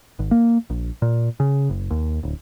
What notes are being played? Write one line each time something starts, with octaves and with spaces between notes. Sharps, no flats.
G#1
A#3
A#1
A#2
C#3
F#1
D#2
D1